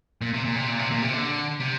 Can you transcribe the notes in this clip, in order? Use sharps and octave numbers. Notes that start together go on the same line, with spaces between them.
A#2
C3
A#2
C3
A#2
C3
A#2
C3
D3
C3